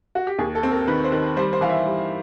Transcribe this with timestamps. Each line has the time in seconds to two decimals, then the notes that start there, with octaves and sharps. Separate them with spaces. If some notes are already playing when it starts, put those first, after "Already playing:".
0.15 F#4
0.27 G4
0.38 D#2 G#4
0.55 A4
0.63 C4
0.71 A#4
0.88 D#3 B4
1.04 C5
1.12 D#3
1.37 G3 C5
1.53 C5
1.61 E3 F5
1.69 E5
1.85 G3